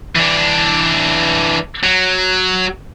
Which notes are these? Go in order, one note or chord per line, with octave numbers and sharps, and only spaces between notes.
E3 D4
F#3